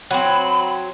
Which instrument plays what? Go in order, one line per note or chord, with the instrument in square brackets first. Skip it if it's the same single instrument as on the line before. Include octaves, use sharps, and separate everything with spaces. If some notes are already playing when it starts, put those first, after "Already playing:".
[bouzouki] F#3 C4 [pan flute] B5